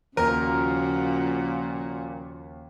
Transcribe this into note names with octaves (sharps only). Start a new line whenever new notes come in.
D#2 A#2 C#3 F3 F#4 A#4